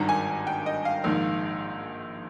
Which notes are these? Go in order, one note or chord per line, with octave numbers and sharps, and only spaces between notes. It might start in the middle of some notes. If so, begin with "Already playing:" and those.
Already playing: G#1 G2 D#3 A#5
G#5
G5
D#5
F5
A#1 G#2 D#3